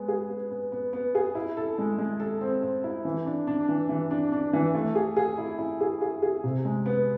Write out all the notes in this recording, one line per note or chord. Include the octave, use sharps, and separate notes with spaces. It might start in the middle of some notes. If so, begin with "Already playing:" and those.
Already playing: G#3 B3
G#4
B3
B3
B3
B3
G#4
E4
A4
G#3
G#3
A4
C4
C4
E4
E3
D4
D4
E3
E3
D4
D4
E3
A3
G#4
G#4
E4
E4
G#4
G#4
G#4
C3
G#3
B3